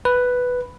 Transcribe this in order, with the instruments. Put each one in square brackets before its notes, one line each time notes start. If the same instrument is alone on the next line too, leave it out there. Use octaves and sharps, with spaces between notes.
[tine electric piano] B4